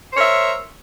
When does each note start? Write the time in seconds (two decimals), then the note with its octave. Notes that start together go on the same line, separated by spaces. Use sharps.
0.12 C5
0.15 C#5
0.18 A#4
0.20 E5